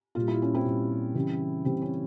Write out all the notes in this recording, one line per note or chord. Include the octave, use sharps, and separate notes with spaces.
A#2 G3 F4
E4
C#4
C4 E4
A#2 G3
C#3 E3 G3
C#3 E3 G3 C4
C#4